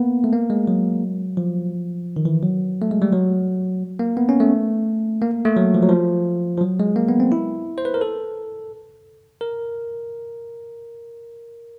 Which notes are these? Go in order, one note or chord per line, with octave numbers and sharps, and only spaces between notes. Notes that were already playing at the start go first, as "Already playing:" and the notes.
Already playing: A#3 B3
A3
A#3
G#3
F#3
F3
D#3
E3
F#3
A3
G#3
G3
F#3
A#3
B3
C#4
A3
A#3
A3
F#3
F3
F#3
F3
F3
F#3
G#3
A#3
B3
C4
E4
C5
B4
A#4
A4
A#4